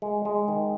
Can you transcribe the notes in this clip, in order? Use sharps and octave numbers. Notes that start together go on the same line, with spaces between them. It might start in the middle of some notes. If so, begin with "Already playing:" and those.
G#3
G#3
D#3